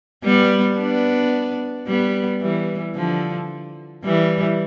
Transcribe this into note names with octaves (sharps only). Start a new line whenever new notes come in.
G3 B3
B3 D4
G3 B3
E3 G3
D3 F3
E3 G3